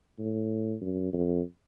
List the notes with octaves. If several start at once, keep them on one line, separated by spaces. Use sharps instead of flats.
A2
F#2
F2